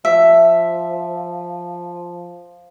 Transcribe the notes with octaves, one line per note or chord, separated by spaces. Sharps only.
F3 E5